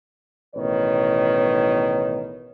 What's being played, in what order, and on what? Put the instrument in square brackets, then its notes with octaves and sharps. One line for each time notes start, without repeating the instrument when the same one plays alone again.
[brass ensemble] A1 B2 D#3 B4 C#5